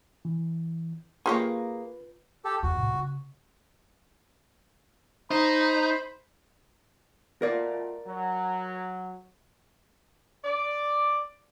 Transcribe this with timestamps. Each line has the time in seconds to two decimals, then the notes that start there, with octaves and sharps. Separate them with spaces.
0.25 E3
1.26 A#3 F4 G4 G#4 B4 C#5
2.45 G4 A4
2.63 E2 F#4
2.75 C2 A2
2.94 C#3
5.31 D#4 C5 B5
7.42 B2 A3 F4 A#4 D5
8.06 F#3
10.44 D5